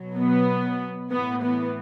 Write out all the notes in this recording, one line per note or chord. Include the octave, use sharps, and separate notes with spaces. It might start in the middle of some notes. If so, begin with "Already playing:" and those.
Already playing: B2 F#3
B3
A2 E3 B3
B3